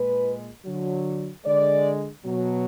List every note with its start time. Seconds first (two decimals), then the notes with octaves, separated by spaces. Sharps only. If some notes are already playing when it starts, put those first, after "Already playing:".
Already playing: A#2 G#3 B4
0.66 D3 F#3
1.45 D3 G#3 D5
2.25 B2 F#3